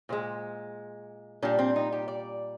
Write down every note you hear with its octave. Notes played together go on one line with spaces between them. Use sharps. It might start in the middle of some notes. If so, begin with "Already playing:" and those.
A#2 G#3 C5
A#2 G3 D4
C4
D#4
G4
D5